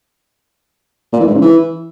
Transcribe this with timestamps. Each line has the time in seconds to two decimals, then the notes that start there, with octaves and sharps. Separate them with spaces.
1.12 A#2
1.20 E3
1.27 G#2
1.34 C#3
1.41 E3